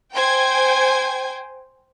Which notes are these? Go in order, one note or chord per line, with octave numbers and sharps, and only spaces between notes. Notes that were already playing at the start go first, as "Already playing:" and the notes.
C5 G5 G#5 G#6